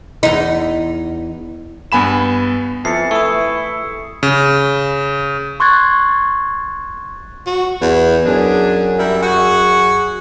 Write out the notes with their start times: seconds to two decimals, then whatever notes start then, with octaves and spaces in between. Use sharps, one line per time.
0.23 E2 D#4
1.92 G2 B3 G#5 B5 E7
2.85 F2 E3 A5 C7 C#7
3.11 A3 E4 C#6 D#6
4.23 C#3
5.60 C6 C#6 F#6 G#6 A6
7.46 F#4
7.81 E2
8.26 F#2 D4 G#4
8.98 G3 E4 A#4
9.21 F#4 G#4